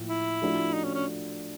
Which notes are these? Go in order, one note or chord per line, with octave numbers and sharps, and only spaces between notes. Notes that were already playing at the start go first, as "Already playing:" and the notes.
Already playing: A2 F3 A#3
E4
F3 A3 D4 F#4 A4
D#4
C#4
C#4